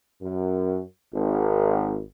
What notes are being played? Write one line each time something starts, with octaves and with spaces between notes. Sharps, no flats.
F#2
G#1